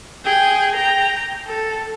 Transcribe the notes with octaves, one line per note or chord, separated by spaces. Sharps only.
G#4 G5
G5 A#5
A4